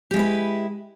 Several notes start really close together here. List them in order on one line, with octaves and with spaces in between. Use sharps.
G4 G#3 E4 B4